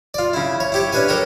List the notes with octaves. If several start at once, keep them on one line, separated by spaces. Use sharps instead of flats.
F4 D5
C#3 E4
C#5
E4 G4 C#5
C#4 D4 B4 C#5 G#5
G4 A4 A#4 C#5